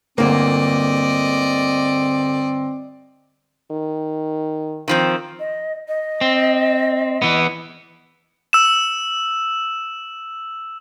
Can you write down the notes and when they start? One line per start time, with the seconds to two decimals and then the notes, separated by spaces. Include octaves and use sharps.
0.18 G1 D2 A#3 C4 D5 D#5
3.71 D#3
4.88 D#3 F3 C4
5.40 D#5
5.88 D#5
6.21 C4
7.22 E3 B3
8.53 E6 E7